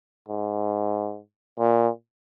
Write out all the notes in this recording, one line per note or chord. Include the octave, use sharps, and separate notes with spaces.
G#2
A#2